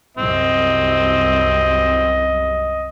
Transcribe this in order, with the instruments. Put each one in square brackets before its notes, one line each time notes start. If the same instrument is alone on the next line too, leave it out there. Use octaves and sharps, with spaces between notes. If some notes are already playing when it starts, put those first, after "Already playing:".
[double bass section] C2 F#2 [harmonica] C4 [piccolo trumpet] D#5